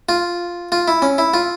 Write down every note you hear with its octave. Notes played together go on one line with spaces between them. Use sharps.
F4
F4
E4
C#4
E4
F4